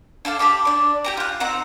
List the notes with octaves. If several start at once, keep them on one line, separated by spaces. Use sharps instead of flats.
D4 A4 F5 A5
G4 A5 B5 D6
D4 D5
G4 G5 A#5
F4 F#6
C4 D#4 F#5 A#5